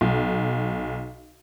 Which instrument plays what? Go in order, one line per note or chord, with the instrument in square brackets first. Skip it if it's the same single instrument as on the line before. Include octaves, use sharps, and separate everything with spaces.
[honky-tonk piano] B1